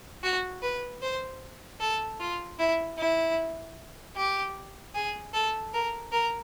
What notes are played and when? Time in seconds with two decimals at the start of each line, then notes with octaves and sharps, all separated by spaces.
0.23 F#4
0.62 B4
1.02 C5
1.81 A4
2.20 F4
2.59 E4
2.98 E4
4.16 G4
4.95 G#4
5.34 A4
5.74 A#4
6.12 A#4